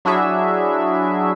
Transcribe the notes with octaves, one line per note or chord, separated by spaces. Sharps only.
F#3 D4 E4 F#4 G#4 E5